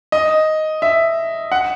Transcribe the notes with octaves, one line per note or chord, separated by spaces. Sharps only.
D#5
E5
F#5